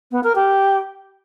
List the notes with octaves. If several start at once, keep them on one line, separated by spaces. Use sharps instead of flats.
B3
A#4
G4